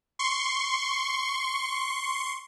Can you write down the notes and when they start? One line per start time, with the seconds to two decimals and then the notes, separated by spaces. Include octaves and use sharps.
0.19 C6 C#6